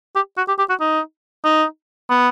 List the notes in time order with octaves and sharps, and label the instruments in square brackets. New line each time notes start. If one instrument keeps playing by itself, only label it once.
[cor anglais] G4
F#4
G4
G4
F#4
D#4
D#4
B3